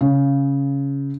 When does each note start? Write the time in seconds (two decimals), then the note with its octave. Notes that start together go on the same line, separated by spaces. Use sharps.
0.01 C#3